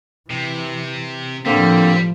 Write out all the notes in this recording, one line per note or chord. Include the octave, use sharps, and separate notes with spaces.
C3 E3
A2 D3 F3 G3 A#3 C4